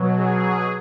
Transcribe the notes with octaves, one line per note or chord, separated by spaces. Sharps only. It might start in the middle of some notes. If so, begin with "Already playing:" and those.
Already playing: B2 F#3
G#4